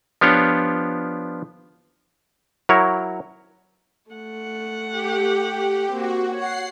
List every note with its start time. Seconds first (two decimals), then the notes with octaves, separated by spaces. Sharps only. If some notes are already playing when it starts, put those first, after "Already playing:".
0.21 F3 B3 D4 F4 G4 C#5
2.69 F#3 E4 A#4 C#5
4.11 A3 F#5
4.90 G4
5.91 A#3 C4 F#4
6.34 C#5 F#5 C7